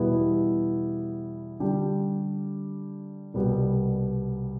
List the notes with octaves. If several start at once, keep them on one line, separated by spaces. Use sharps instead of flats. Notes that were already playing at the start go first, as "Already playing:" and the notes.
Already playing: E2 B2 G3 B3 E4
D3 G3 D4 G4
C2 B2 G3 B3